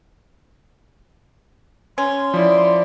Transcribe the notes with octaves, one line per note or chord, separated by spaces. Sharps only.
C#4 C6
F3 E4 D5